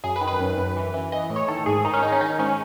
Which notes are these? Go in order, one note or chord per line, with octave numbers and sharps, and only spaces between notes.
F#2 G#4
B4
D#3
B4
F#2
F#2
E3
E3
E3 D#5
A2
C#5
D#3 A4
G#2 G#4
D#3 D#4
C#4
D#3 D#4
C#4
D#3 D#4
G#2 C#4